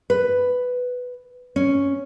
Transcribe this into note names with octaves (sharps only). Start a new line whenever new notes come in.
B4
C#4